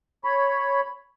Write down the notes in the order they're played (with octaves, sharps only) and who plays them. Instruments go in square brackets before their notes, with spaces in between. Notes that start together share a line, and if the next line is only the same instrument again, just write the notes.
[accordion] C#5 B5